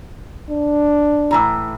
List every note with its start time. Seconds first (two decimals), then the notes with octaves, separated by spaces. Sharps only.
0.51 D4
1.31 A2 E3 A#5